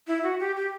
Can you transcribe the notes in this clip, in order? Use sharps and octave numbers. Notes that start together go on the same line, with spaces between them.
E4
F#4
G4
G4